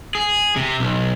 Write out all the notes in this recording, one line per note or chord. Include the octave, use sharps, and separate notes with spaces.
G#4
C3
B1